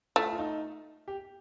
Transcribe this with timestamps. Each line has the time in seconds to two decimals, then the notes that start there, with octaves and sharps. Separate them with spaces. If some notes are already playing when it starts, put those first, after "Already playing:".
0.16 A3 F4
0.31 F4
0.39 D#4
1.08 G4